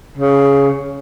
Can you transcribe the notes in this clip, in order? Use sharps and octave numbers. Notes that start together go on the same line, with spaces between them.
C#3